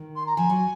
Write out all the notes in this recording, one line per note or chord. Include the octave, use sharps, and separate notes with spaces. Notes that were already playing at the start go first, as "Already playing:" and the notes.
Already playing: D#3
C6
A#5
F3 G#5
F#3